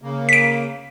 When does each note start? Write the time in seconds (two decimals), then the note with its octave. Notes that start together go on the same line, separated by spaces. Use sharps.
0.02 C#3 A#3
0.29 B6 D7